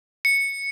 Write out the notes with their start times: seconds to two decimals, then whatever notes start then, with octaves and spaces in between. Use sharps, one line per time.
0.25 C#7